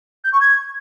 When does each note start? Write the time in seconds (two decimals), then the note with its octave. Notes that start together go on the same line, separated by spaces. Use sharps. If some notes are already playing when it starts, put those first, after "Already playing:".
0.24 G6
0.32 C#6
0.41 G#6